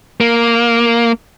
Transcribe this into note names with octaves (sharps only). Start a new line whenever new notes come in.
A#3